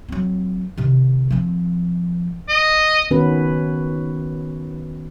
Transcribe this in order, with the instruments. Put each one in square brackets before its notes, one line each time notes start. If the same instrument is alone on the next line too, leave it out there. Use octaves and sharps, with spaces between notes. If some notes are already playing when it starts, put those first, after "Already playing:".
[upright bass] F#3 C4
C3 D#3
F3 C4
[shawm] D#5
[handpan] D#3 B3 C#4 F#4 B4